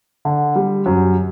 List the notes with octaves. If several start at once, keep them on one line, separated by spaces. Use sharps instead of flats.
D3
G3
F#2